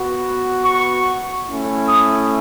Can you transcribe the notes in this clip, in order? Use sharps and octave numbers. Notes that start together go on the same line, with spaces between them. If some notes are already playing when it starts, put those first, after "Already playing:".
Already playing: B3 F#4
C#6
A3 C#4 E4
D#6